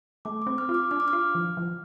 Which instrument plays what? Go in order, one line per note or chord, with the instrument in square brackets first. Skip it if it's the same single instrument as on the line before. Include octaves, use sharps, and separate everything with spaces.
[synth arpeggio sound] A3 [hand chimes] D6
[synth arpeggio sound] C4 [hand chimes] D6
[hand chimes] F6
[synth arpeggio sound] F4
[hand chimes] D6
[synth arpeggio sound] D4 [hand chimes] F6
[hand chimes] D6
F6
[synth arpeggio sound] F4
F3
F3